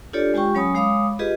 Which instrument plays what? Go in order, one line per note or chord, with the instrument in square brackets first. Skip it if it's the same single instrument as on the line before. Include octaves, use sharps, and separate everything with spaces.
[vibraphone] D4 F4 G4 A4 C#5 D5
G#3 F4 G4 G5 C#6
F#3 C#4 C#5 G#5 B5 D#6
G#3 C#5 F5 B5 D6 D#6
F4 G4 G#4 B4 D#5